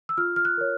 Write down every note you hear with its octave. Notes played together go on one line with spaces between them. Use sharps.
E6
F4 F6
F6
F#6
A#4 C#5